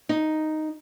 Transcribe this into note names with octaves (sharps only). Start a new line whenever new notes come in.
D#4